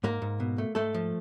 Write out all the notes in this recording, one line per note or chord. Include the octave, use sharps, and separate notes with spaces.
G#2 A#3 A#4
G#2
B2
A3
G#2 A3 A4
F3